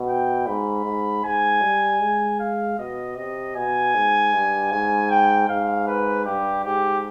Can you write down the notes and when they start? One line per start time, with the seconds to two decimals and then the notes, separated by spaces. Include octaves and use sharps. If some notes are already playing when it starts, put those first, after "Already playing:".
Already playing: B2
0.09 G5
0.47 G#2 B5
0.85 G#2
1.25 G#2 G#5
1.62 G3
2.02 G#3
2.40 F5
2.78 B2 D#5
3.17 C3 D#5
3.55 B2 G#5
3.95 G#2
4.33 G2
4.71 G#2 G#5
5.11 G5
5.48 G#2 F5
5.88 B4
6.25 G2 G4
6.64 G#2 G4